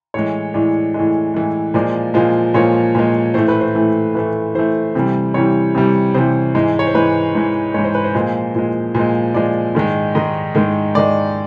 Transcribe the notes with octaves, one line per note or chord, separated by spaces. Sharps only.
A2 E3 G#3 C#5
A2 E3 G#3 D5
A2 E3 G#3
A2 E3 G#3
A#2 F3 G#3 D5
A#2 F3 G#3
A#2 F3 G#3 C#5
A#2 F3 G#3
A2 E3 A3 C5
B4
C5
A2 E3 A3
A2 E3 A3 B4
A2 E3 A3 C5
C3 E3 G3
C3 E3 G3 C#5
C3 E3 G3
C3 E3 G3 C5
G#2 E3 G#3
C#5
C5
G#2 E3 G#3 B4
G#2 E3 G#3
G#2 E3 G#3 C#5
C5
B4
C5
A#2 F3 G#3
A#2 F3 G#3
A#2 F3 G#3
A#2 F3 G#3 D5
G#2 D#3 G#3
G#2 D#3 G#3 D#5
G#2 D#3 G#3
G#2 D#3 G#3 D5